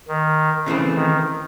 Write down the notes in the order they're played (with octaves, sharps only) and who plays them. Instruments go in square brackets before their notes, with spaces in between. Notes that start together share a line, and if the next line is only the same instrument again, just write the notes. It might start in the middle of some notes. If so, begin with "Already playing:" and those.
[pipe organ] D#3
[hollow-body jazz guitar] C#3 E3 A3 C4
[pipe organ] D#3